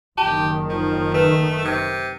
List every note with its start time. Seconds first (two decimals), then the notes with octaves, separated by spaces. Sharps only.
0.18 F#1 D#3 G4 A5
0.69 F3
1.14 A3 B4
1.65 C3